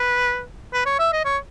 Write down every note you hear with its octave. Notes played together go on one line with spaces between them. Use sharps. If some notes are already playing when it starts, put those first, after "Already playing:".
Already playing: B4
B4
C#5
E5
D#5
C#5